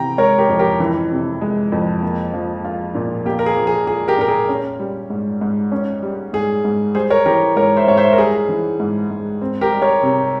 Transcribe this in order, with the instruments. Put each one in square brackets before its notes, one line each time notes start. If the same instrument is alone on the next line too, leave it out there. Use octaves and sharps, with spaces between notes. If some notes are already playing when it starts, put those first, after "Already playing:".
Already playing: [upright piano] C3 E3 [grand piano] G5 A#5
[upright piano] G#3 [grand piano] A#4 C#5
[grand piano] G4 A#4
[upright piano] F2
[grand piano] G4 A#4
[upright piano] E3
C3
G#3
F2
A#3
F3
F4
A#2
[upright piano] A#3 [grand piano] G4
[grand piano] A#4
G#4
[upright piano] F3
[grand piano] G#4
[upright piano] F4 [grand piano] G#4
[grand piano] G4 A#4
[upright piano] A#2 [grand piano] A#4
[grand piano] G#4
[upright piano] C#4
G3
G#2
G#2
C#4
G3
[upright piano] G#2 [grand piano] G#4
[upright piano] G#2
[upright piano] G3 [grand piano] G#4 C5
[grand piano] A#4 C#5
[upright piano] E3 [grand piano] G4 A#4
[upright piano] G#2 [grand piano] A#4 C#5
[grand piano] C5 E5
[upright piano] G#2 [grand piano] C#5
[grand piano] C5 E5
A#4
[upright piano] G3 [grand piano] G#4
[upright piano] E3
G#2
G#2
C4
[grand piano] G4 A#4
[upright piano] G3
[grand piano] A#4 C#5
[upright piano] C3